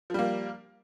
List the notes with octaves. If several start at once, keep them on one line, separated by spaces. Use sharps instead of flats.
F3 G3 A#3